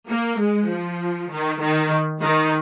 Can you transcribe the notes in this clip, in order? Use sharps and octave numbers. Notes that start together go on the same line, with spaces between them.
A#3
G#3
F3
D#3
D#3
D#3